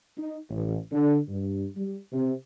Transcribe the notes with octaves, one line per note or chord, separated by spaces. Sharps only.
D#4
A1
D3
G2
G3
C3